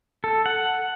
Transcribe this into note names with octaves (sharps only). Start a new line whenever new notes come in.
A4
F#5